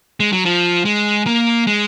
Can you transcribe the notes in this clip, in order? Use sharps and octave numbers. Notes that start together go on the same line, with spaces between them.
G#3
F#3
F3
G#3
A#3
G#3